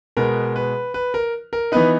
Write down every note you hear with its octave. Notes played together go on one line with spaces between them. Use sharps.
B2 G#3 B3 A#4
B4
B4
A#4
A#4
E3 B3 D#4 B4